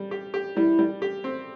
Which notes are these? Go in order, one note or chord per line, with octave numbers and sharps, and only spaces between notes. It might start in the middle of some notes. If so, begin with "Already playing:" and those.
Already playing: G3
G4
G4
G3 E4
G3
G4
C4